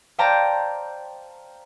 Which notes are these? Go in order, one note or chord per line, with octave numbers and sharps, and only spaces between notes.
C5 D5 F5 G5 A5 A#5